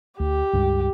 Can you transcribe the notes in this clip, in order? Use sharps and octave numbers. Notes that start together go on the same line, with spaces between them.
D2 G4
C#2 G2 G3